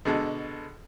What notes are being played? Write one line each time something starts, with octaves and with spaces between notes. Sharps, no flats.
B2 D3 G#3 A4